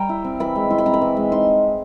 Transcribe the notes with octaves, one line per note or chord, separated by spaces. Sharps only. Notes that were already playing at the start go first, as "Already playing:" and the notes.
Already playing: G3 G5 A#5
E4
C4
E3 B5
G#3
E4 C6
B5
C4 A#5
B5
E3
G#3
D#4 C6